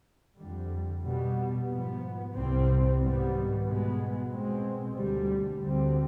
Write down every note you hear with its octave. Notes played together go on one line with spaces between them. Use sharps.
F2 D3 G3
B2 G3 B3
G#2 F3 B3
C2 C3 G3 C4
G#2 D#3 G3 B3
B2 G#3 B3
B2 G#3 C4
D2 D3 G3
D2 D3 G3 C4